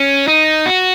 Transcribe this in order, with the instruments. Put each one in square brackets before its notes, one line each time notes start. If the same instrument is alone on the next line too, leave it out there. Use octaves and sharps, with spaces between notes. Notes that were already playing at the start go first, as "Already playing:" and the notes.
Already playing: [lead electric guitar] C#4
D#4
F#4